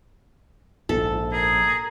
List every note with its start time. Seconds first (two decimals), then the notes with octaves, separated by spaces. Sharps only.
0.89 A#1 G#2 A4
1.33 G#4 A#4